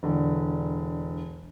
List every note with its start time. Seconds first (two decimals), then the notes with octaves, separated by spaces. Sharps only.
0.03 E1 D3